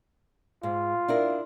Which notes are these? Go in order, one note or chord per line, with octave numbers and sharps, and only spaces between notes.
G#2 F4
D4 E4 A#4